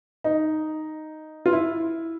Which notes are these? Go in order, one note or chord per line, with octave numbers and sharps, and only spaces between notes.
D#4
F4
E4